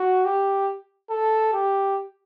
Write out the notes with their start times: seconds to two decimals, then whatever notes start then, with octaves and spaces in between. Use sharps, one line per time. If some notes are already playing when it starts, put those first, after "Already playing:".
Already playing: F#4
0.25 G4
1.10 A4
1.53 G4